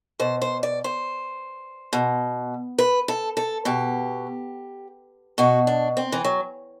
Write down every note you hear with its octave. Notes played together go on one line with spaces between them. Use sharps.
B2 C5
C5
D5
C5
B2
B4
A4
A4
B2 G4
B2 F#4
D4
C4
E3
F#3